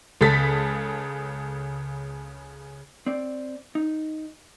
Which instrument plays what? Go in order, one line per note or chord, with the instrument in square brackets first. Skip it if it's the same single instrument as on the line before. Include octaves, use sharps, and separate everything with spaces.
[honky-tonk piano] C#2 C#3 A4 A6 B6
[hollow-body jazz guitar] C4 D5
D#4